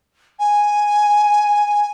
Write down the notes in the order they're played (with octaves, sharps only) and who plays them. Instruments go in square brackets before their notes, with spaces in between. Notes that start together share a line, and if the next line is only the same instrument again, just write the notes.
[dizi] G#5